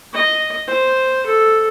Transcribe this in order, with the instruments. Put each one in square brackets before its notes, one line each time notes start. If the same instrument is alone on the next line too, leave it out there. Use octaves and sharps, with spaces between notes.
[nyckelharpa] D#5
C5
A4